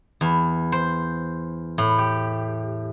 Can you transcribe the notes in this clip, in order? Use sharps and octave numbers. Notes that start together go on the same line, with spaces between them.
E2
C5
A2
G4